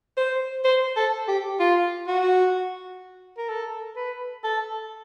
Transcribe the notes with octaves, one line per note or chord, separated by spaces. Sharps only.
C5
C5
A4
G4
F4
F#4
A#4
A4
B4
A4